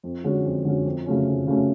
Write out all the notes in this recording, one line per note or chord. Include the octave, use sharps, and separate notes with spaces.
F2
D3 G#3 C#4 F#4
F2
D3 G#3 C#4 F#4
F2
C#3 F#3 A3 C#4
F2
C#3 F#3 A3 C#4